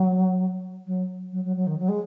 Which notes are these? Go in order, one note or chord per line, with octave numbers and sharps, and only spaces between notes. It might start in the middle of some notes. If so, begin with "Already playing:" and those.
Already playing: F#3
F#3
F#3
F#3
F#3
D#3
F#3
G#3